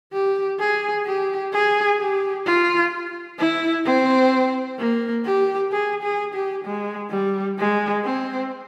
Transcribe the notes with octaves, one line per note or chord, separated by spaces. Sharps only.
G4
G#4
G4
G#4
G4
F4
E4
C4
A#3
G4
G#4
G#4
G4
G#3
G3
G#3
C4